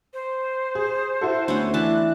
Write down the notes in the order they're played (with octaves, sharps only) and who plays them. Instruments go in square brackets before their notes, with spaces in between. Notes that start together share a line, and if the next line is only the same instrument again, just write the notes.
[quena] C5
[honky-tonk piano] G#4
E4 F#4 A4
[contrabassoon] D2 [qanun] B3 C#4 F#5
[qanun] E3 D4 A5 [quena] F#6